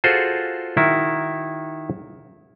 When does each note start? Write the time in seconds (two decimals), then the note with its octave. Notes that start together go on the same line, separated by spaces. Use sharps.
0.04 F4 F#4 G#4 A4 C5
0.77 D#3 E4 F#4